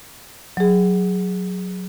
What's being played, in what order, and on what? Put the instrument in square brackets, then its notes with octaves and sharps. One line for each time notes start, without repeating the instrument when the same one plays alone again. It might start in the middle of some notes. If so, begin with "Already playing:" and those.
[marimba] F#3 G#4